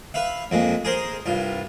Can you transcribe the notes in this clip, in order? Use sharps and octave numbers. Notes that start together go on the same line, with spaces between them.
B4 E5 F5
F2 A#2 G#3
G#4 A#4 C5
C2 G2 F4